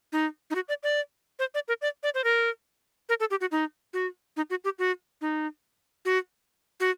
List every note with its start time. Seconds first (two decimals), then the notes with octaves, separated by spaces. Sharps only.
0.12 D#4
0.51 D#4
0.55 F#4
0.69 D5
0.83 D5
1.39 C5
1.54 D5
1.68 A#4
1.82 D5
2.03 D5
2.14 C5
2.24 A#4
3.09 A#4
3.20 A4
3.31 G4
3.41 F#4
3.52 D#4
3.93 F#4
4.37 D#4
4.50 F#4
4.64 G4
4.79 F#4
5.21 D#4
6.05 F#4
6.80 F#4